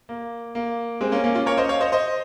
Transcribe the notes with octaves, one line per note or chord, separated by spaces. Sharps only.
A#3
A#3
G#3 C4
A#3 C#4
A#3 C#4
C#4 F4
A#4 C#5
C5 D#5
C#5 F5
C5 D#5
C5 D#5